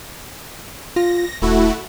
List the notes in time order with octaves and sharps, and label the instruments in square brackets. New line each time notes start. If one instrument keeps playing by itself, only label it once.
[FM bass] F4 [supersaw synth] A#6
[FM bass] D#1 [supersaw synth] A3 E4 F#4